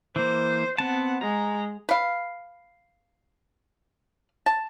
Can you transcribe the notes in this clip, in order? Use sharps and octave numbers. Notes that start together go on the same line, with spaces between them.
E3 A#3 C5
B3 C4 F#5 A5
G#3 A#5
B4 F5
A5